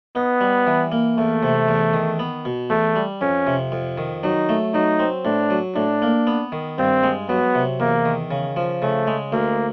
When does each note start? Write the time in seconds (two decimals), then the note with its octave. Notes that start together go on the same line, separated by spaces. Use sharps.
0.15 B3 D#4
0.41 G3
0.67 E3
0.92 A#3
1.18 E2 A3
1.43 C3
1.69 E2
1.93 D#3
2.19 B3
2.45 B2
2.70 E2 A3
2.96 G3
3.21 F2 C#4
3.47 C3
3.72 F2
3.98 D#3
4.23 F#3 D#4
4.49 A3
4.74 F#3 D#4
4.99 C4
5.25 A2 D4
5.50 F#3
5.76 A2 D4
6.02 A#3
6.27 B3
6.52 D#3
6.78 G2 C4
7.03 G#3
7.29 F#3 B3
7.55 C3
7.80 E2 A#3
8.05 D#3
8.31 C#3
8.56 F3
8.82 C#3 A3
9.07 G#3
9.32 D2 A#3